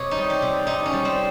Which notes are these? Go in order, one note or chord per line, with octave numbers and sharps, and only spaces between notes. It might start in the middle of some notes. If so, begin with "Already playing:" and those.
Already playing: C3 C#5 D#5
D#4
G3
G4
C3
C3 D#4
C#4
G3
C4